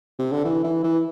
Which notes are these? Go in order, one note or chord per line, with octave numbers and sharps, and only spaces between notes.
C3
D3
E3
E3
E3